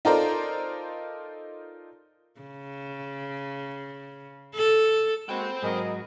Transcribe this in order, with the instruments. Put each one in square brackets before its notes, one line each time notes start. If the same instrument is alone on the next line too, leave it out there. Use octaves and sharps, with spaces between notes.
[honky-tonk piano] D#4 F4 A4 A#4 C5 D5
[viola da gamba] C#3
A4
[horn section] G#3 A#3 F#4 [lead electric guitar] C5 G5 [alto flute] B5
[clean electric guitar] G#2 F#3 F#4 [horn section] G#4 A#4 D#5